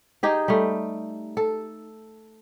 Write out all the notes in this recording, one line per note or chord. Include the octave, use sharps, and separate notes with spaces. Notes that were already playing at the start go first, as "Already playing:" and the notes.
D#4 G4 G#4
G3 A3
A4